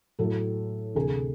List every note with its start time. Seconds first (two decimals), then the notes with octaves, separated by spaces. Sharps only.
0.19 A2 F#3 A3 A4
0.95 D2 C3 E3 A3 G#4